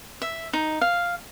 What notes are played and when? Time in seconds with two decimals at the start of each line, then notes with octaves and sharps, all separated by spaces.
0.22 E5
0.53 D#4
0.81 F5